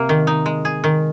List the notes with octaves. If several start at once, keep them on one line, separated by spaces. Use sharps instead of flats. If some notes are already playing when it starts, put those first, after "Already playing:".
Already playing: C3 A#3
D#3
D#4
G#3
G#4
D#3